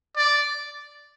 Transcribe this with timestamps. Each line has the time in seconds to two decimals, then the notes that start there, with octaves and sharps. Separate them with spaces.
0.17 D5